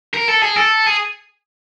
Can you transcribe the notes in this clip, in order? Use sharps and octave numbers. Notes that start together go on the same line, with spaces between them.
A#4
A4
G#4
A4
G#4